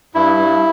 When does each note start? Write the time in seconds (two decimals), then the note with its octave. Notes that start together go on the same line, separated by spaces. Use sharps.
0.15 G2 E4
0.38 G2